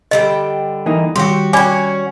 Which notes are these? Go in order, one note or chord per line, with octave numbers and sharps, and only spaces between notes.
D3 G3 D#5 G5
E3 A#3 D#4
D#3 G3 F#4 G4 C6
C#4 F#4 D5 G5 G#5 B5 D6